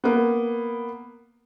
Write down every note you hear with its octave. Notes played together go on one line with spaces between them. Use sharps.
A#3 B3